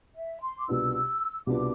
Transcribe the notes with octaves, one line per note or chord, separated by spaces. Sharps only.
E5
C6
D6
C2 B2 B3 D4 F4 E6
C2 B2 B3 D4 F4 D6